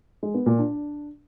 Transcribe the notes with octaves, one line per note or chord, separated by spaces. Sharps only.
G#3
B3
A#2
D4